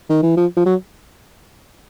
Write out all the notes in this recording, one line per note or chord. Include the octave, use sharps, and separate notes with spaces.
D#3
E3
F3
F3
F#3